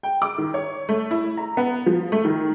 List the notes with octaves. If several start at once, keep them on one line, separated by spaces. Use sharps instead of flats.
G5
D6
D#3
C#5
A3
E4
A#5
B3
F3
A3
D#3